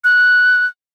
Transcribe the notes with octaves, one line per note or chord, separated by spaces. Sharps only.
F#6